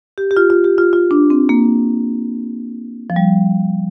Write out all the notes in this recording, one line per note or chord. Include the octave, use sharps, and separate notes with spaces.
G4
G4
F4
F4
G4
F4
F4
D4
C4
A#3
F3
G3